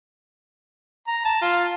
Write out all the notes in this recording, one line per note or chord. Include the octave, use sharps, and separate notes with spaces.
A#5
A5
F4